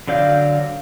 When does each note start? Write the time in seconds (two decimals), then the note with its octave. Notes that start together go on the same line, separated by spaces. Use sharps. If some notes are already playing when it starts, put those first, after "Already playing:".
0.08 D3 F#3 D5 F5 G6